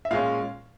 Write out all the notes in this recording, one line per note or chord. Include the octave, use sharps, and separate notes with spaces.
E5
A#2 G#3 C#4 F5